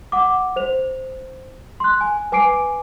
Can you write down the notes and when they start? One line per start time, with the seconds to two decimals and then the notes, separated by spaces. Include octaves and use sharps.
0.12 F#5 D6
0.56 C5 F7
1.80 C6 F#6
2.01 G#5
2.32 B4 G#5 D6 C7 D7